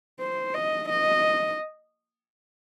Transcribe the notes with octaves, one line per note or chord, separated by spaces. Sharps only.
C5
D#5
D#5